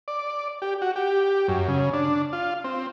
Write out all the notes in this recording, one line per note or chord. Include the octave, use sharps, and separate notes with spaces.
D5
G4
F#4
G4
F#2
C#3
D4
F4
C4